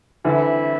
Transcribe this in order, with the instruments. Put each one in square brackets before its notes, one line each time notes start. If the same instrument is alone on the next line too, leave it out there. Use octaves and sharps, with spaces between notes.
[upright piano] D3 E3 [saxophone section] G3 C4 E4